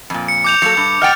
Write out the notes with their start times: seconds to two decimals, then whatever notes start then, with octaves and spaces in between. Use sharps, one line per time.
0.10 F2 A#2
0.28 C#7
0.44 D6 G6 F7
0.62 F#3 A#3 A4 C#7
0.77 G2
1.02 D#5 F#5 G5 F6 A6 F7